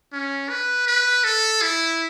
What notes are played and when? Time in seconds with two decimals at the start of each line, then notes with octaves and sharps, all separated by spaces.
0.12 C#4
0.49 B4
0.87 B4
1.25 A4
1.63 E4